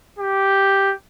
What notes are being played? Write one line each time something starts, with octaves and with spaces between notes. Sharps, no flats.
G4